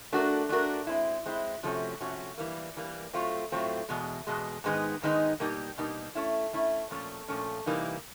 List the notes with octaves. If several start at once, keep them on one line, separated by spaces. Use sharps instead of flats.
A3 D4 F#4 A#4
A3 D4 F#4 A#4
G#3 C4 E4
G#3 C4 E4
C3 F3 A3 C#4 F#4
C3 F3 A3 C#4 F#4
E3 G3 A#3
E3 G3 A#3
A2 F#3 A3 C4 F4
A2 F#3 A3 C4 F4
E2 B2 G#3
E2 B2 G#3
G#2 D#3 G#3 B3 D#4
G#2 D#3 G#3 B3 D#4
B2 G3 A#3 D#4 G4
B2 G3 A#3 D#4 G4
A3 C#4 E4
A3 C#4 E4
A#2 F3 A3 C#4
A#2 F3 A3 C#4
C3 E3 G3 A#3 D#4